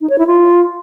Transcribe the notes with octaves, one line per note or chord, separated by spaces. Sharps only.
D#4
C#5
E4
F4